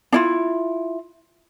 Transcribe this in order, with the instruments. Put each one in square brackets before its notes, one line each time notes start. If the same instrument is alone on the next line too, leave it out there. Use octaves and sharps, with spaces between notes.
[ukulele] D4 E4 F4